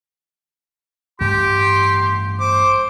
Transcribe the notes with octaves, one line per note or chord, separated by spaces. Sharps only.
A1 G2 A3 G4 C6
C5 D6